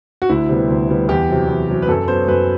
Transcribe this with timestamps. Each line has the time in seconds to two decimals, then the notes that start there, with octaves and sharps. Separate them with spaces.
0.22 F#4
0.29 D2 E4
0.49 C3 G3 B3
0.69 D2
0.89 C3 G3 B3
1.09 E2 G4
1.28 C3 F#3 C4
1.48 E2
1.69 C3 F#3 C4
1.82 B4
1.88 F#2 A4
2.08 F#3 B3 C5
2.28 F#2 B4